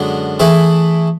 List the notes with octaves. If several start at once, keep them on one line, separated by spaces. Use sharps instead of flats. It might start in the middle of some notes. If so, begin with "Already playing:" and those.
Already playing: F#2 D3 G#3 B3
E3 A3 E4 G#4